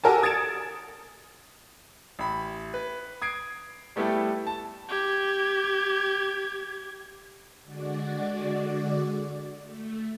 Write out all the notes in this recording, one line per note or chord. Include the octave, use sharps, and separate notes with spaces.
F#4 G4 A4 A#4 G#5 A5
D#6 G#6 A6 C#7 D7 E7
A1 B5
B4
D#6 G#6 C7 D7
G3 A3 B3 E4 G4 A4
A5
G4 G#6
D3 G#3 F#4 D5
A3